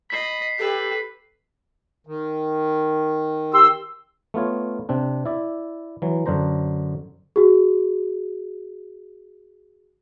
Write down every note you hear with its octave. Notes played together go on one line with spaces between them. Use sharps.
D#5 B5 B6 C7
G4 A4 B4
D#3
G4 C6 E6
A3 B3 F4 C#5
C3 C4 D4
E4 D5 E5
E3 F#3
F#2 D3 D4 C5 A#5
F#4 G#4